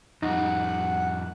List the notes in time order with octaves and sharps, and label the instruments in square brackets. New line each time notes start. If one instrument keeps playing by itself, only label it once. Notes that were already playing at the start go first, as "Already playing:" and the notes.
[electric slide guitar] F2 G3 [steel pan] D#4 [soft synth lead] F#5